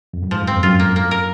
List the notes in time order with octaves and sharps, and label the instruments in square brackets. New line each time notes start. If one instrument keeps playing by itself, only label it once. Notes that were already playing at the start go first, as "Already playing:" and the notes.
[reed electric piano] F2
F#2
[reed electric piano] G#2 [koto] F3
[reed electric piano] F#2
[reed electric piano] F2 [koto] C4
[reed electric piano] F#2 [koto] F4
[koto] A#3
A#3
[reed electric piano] F#2
[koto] A#4